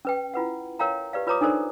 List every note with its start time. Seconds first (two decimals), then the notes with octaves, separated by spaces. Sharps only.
0.05 C#4 B4 G5
0.34 E4 F4 B4 F#5
0.79 A#4 C#5 F5 G5 A#5
1.13 G4 B4 D5 F5
1.27 F4 B4 C#5 A#5 D6 D#6
1.41 D4 D#4 A4 A#4 C5 D5